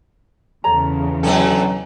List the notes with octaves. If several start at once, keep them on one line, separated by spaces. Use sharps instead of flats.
E2 C#3 A4 C#5 A#5
B2 D3 F#3 A4 G5 G#5